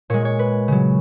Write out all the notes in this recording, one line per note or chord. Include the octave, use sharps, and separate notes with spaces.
A#2 G#3 C#5
C#5
B4
C#3 F#3